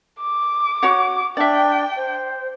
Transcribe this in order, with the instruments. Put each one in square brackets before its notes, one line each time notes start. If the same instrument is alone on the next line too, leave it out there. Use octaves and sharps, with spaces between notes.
[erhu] D6
[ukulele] F#4 C#5 F#5
[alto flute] D4 [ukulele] D5 E5 [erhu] G5
[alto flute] C5